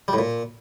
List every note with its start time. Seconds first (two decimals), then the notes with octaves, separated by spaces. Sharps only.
0.08 G3
0.13 A2
0.18 A#2